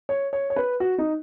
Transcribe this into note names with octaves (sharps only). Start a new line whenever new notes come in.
C#5
C#5
C#5
B4
F#4
D#4